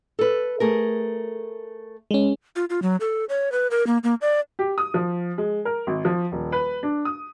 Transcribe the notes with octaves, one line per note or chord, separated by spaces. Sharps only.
A4 B4
A3 G#4 A#4
G#3 C#4
F4
F4
F#3
A4
C#5
B4
A#4
A#3
A#3
D5
G4
D#6
F3
G#3
A#4
G#1
F3
D#1
B4
D4
D#6